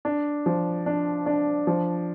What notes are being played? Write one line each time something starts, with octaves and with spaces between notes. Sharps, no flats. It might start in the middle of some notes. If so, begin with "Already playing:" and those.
D4
F3
D4
D4
F3